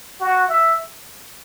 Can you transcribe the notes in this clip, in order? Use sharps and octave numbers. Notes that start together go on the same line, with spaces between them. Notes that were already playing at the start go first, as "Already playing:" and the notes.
F#4
E5